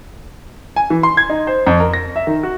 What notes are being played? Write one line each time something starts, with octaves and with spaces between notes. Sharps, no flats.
G#5
E3
C6
G#6
D#4
C5
F2
A#4
A#6
E5
D#3
F#4